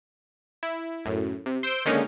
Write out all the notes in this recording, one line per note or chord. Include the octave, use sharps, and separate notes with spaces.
E4
F#2 A2
C3
C5 E6 G6 D7
D3 D#3 G#3 A#3 C#4 D#4